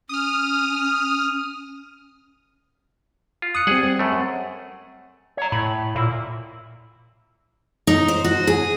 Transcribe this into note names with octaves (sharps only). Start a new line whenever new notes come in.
C#4 D#6 F6
F4
D#6 F#6 C#7
G3 C4 G#4 F#5
C4
F#2 A3
C#5 A#5
A2 B5
A#2 E4
D#4
C5
F#4
G#4